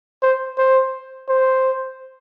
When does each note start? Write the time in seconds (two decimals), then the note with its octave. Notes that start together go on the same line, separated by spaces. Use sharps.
0.23 C5
0.58 C5
1.29 C5